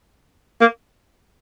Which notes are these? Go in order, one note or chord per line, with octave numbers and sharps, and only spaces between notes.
A#3